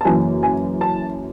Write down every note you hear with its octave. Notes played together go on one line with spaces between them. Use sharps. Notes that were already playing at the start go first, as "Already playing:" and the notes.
A5
F#1 F#2 E3 G#5
G#5
A5